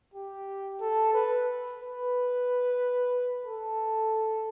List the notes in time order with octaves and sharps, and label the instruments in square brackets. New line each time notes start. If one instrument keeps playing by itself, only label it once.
[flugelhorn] G4
A4
B4
B4
A4